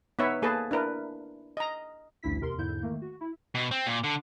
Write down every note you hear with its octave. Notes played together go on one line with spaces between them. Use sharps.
B3 D#4 B4 C#5 E5
A#3 G#4 A4 B4 A5
D4 E4 A#4 B4
D#5 A#5
A1 D2 G2 E4 B6
E2 C3 A#4 C6
E2 G#2 D3 E4 G6
D#3 A3 A#3
F#4
E4
B2
C4
A#2
D3